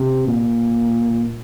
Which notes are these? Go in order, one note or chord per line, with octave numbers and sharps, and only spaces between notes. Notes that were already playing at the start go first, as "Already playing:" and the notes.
Already playing: C3
A#2